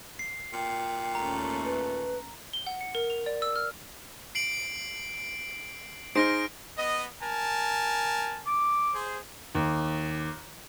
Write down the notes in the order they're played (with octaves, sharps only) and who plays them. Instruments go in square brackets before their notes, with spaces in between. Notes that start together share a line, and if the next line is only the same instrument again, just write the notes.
[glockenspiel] C7
[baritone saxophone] A#2 [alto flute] G5
[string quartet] D#2 A3 C#4 [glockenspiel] A#5
[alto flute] B4
[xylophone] G7
F#5
C#7
A#4
F7
D5
E6
F6
[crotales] C7 D7 F#7
[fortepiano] D#4 G#4 C5 [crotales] F6 A#6 D7
[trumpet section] B3 D#5
A#4 G#5 A5
[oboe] D6
[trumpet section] G#4 C5
[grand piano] D#2